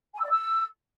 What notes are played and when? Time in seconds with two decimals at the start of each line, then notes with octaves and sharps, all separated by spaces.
0.14 G#5
0.20 E6
0.25 D5
0.30 E6